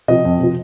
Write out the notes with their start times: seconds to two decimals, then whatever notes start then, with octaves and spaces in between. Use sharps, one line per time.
0.08 C3 F3 D#5
0.25 F2
0.39 C3 F3